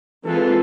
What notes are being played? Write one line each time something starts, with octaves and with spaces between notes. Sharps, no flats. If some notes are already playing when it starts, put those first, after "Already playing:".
E3 G#3 C4 F4 A4 B4